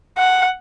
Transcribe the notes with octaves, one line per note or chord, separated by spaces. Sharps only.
F#5